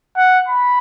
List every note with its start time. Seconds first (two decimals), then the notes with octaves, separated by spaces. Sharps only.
0.17 F#5
0.48 B5